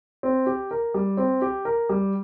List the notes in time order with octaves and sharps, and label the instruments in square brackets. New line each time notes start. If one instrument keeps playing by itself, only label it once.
[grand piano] C4
G4
A#4
G3
C4
G4
A#4
G3